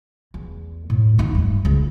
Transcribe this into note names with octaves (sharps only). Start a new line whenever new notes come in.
E2
A2
D#2 D#4
G2
C#2